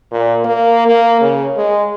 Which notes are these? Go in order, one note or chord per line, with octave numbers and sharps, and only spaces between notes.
A#2
A#3
A#3
C#3
G#3